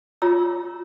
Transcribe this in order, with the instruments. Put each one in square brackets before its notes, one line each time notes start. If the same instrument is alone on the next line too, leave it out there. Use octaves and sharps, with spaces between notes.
[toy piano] F4 C#5 A#5 E6